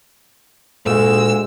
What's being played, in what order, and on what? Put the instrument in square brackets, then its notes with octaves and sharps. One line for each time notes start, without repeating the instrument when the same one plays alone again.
[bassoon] D2 [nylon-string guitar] A#2 [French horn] G#3 [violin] E6